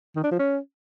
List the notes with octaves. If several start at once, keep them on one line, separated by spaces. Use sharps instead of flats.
D#3
D4
F3
C#4